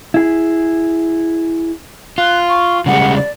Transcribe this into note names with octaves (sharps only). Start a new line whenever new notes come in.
E4 G#4
F4 F#6
C#6
C#3 G3 G#3 F#5
D5